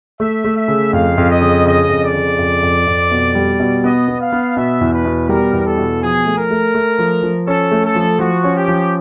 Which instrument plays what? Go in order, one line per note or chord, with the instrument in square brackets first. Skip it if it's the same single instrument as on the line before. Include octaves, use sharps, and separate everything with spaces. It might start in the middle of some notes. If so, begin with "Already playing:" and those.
[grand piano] A3 [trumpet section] E5
[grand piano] A3
[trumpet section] E5
[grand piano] C#3
[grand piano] F2 [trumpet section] F5
[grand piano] F2
[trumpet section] D#5
[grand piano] C#3
[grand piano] C#3 [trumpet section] D#5
[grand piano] F2
[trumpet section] D5
[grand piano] C#3
F2
F2
F2
B2
G3
B2
[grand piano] B3 [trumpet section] D#5
[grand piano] B3
[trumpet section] F5
[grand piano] B3
[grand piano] B2 [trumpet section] E5
[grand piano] E2
[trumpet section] B4
[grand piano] B2
[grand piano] G3 [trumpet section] A#4
[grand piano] E2
[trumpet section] A4
[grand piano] B2
[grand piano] F3 [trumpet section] G#4
[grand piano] A3
[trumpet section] A#4
[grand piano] A3
A3
F3
F3
[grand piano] C#4 [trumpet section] A4
[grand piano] A3
[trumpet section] A4
[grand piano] F3
[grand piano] F3 [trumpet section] F#4
[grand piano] C#4
[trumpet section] G4
[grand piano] F3